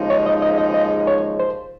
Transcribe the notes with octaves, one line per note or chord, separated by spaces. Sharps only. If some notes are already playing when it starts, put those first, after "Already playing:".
Already playing: D#2 C#3 F3 G#3 D#4
C#5
D#5
D#5
D#5
D#5
C#5
C5